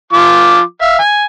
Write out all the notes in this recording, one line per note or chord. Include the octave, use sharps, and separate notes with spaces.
F3 F4 D6
E5 F5
G#5